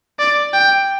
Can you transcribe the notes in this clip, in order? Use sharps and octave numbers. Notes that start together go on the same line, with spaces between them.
D5
G5